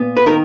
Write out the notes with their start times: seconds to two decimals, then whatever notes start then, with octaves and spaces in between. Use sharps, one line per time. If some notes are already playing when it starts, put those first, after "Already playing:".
Already playing: A#2 B3
0.17 B4
0.26 D#3 A#4